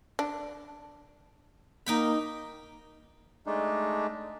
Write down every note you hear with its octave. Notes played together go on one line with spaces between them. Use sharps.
D4
A#3 D#4 G5 B5
G#3 A3 D4 D#4